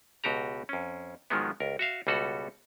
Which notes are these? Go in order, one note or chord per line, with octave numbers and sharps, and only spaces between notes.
C#2 B2 F#4 G4 A#5
F2 C#4
G#2 D#3 F3 F#3 G#3 B3
C#2 A#4
F#4 E5 F5
C#2 B2 G3 F#4 A4 F#5